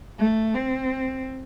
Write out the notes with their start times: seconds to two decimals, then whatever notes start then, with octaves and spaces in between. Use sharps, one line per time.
0.19 A3
0.55 C4